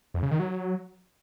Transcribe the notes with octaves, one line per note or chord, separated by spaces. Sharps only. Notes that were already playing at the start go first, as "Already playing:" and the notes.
F2
C#3
D#3
F#3